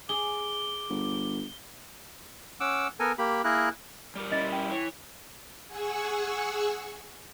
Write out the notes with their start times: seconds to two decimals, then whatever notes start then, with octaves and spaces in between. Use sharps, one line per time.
0.09 G#4 D6 G7
0.90 G1
2.60 C#4 F#5 D6 E6
3.00 B3 A4 A#4 G#5
3.18 A#3 G4 B5
3.44 A#3 E4 G#4 A#4 F#6
4.16 G3 G4 A#4
4.32 C#4 E4 D#5 A6
4.52 G5
4.71 E3 C#5
5.67 G#4 F#5 G#5 C#6 E6